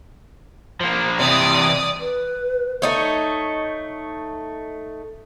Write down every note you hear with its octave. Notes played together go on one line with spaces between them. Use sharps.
F3 A#3
C3 E3 D5 D#6
B4
A3 D#4 C#5